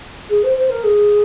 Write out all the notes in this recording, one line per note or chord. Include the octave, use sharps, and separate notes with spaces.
G#4
C5
C5
A#4
G#4